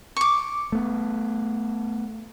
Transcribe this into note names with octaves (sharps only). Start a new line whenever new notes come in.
C#6 D6
A3 B3